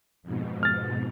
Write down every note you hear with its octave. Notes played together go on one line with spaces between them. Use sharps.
F2 G#2 B2
F6 A6